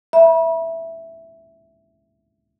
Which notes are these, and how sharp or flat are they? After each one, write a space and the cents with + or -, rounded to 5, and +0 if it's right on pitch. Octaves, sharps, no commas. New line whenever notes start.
E5 +0 B5 -40